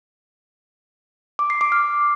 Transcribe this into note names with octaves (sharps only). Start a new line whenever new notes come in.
D6
C7
D6
F6